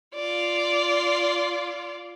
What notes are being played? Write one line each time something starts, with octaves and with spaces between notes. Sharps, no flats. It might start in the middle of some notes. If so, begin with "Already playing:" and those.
F4 D5